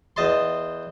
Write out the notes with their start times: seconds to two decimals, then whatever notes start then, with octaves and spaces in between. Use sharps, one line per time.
0.16 E2 D#5 A5 C6